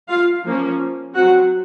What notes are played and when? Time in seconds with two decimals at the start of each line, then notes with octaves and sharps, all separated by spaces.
0.09 F4 F5
0.45 F3 A#3 C#4
1.14 F#3 C4 F#4 F#5